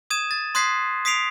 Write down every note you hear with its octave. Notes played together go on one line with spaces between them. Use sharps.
D#6 G#6 D#7 E7
A6
C6 D#6 F#6 G#6 B6 C7
D#6 B6 C7 D7 F7